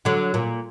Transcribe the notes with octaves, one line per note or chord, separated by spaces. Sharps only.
D3 F#3
A#2